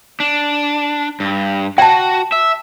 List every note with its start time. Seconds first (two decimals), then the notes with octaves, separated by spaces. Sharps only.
0.20 D4
1.20 G2
1.78 F#4 G5 A5
2.32 E5